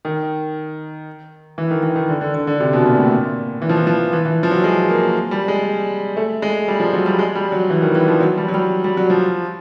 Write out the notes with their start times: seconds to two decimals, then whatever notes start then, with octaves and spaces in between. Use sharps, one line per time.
0.05 D#3
1.58 E3
1.71 D#3
1.83 E3
1.96 D#3
2.09 D3
2.21 D3
2.34 D3
2.47 D3
2.60 C3
2.73 B2
2.85 A#2
2.98 A2
3.11 A#2
3.62 E3
3.69 F3
3.77 E3
3.87 F3
4.13 E3
4.26 E3
4.43 F3
4.51 F#3
4.64 G#3
4.89 A#3
5.31 G3
5.48 G#3
6.17 A3
6.42 G#3
6.68 G3
6.80 F3
6.93 F#3
7.06 G3
7.19 G#3
7.35 G3
7.52 F#3
7.70 E3
7.82 D#3
7.95 E3
8.08 F3
8.21 F#3
8.37 G3
8.48 F#3
8.54 G3
8.84 G3
8.97 F#3
9.10 F3